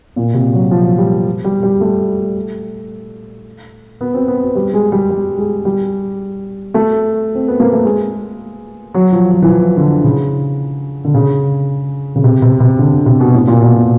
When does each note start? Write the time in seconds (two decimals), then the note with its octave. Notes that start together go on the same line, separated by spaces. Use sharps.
0.16 A#2
0.34 C3
0.53 F#3
0.71 F3
0.98 G3
1.44 G3
1.63 G3
1.81 A3
4.01 B3
4.14 C4
4.28 B3
4.55 G3
4.74 G#3
4.92 G3
5.10 G3
5.38 G#3
5.65 G3
6.74 A3
7.35 C4
7.48 B3
7.60 A#3
7.72 A3
7.85 G#3
8.94 F#3
9.12 F3
9.31 F#3
9.42 E3
9.49 F3
9.77 D3
10.04 C#3
11.05 D3
11.14 C#3
12.16 C#3
12.24 C3
12.42 C3
12.60 C3
12.79 D3
13.06 C3
13.20 B2
13.33 A2
13.47 A#2
13.61 B2
13.75 B2